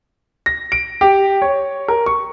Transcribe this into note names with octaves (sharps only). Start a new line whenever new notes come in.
A#6
D7
G4
C#5
A#4
C#6